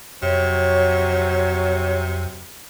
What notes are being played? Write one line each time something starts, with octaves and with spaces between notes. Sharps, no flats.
F2 C3 F#3 C#5